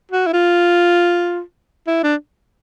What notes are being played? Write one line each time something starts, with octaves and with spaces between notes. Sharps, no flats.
F#4
E4
F4
E4
D4